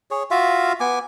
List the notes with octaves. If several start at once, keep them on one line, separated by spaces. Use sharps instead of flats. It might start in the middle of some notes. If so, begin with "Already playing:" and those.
G#4 C#5
F4 F#4 E5 F5
B3 G#5 D6